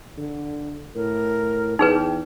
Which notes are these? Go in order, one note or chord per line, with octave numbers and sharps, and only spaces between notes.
D3
A2 A#4
E2 D#4 G#4 B4 G5